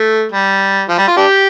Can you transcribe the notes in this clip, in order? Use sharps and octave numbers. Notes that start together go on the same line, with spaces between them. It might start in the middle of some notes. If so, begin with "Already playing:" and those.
Already playing: A3
G3
F3
G3
F4
D4 G4